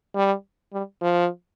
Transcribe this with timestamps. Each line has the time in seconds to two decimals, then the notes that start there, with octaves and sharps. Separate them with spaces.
0.15 G3
0.73 G3
1.01 F3